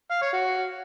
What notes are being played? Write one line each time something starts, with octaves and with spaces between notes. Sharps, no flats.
F5
C#5
F#4